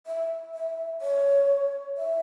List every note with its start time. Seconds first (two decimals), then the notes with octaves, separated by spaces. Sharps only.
0.07 E5
0.55 E5
1.01 C#5
1.97 E5